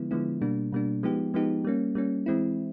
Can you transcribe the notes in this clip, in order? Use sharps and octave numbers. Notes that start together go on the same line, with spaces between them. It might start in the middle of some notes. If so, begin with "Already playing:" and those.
Already playing: D3 F3 G#3 B3 E4
D3 F3 G#3 B3 E4
B2 G3 A#3 D4
B2 G3 A#3 D4
F3 G#3 B3 D#4 G4
F3 G#3 B3 D#4 G4
G3 A#3 C#4
G3 A#3 C#4
E3 G#3 C4 E4